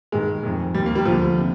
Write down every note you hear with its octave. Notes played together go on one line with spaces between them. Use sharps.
G2 D#3 G#3
F2 D#3
D#2 D#3 G3
A#3
G3
D#2 D3 F3
C3